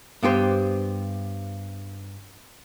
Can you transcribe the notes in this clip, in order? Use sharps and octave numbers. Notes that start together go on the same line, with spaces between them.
G2 B3 G4 C5